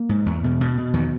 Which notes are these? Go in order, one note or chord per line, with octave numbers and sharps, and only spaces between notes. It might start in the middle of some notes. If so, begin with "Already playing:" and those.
Already playing: A#3
G#2
E2
B2
B2
B2
E2 D#3